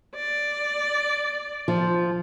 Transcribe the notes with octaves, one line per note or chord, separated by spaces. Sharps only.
D5
F3